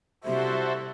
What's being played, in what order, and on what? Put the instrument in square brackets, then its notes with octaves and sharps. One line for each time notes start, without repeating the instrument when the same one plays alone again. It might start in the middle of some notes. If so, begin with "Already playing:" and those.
[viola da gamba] C3 G3 E4 [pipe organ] F#4 A4 C5 [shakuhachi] E5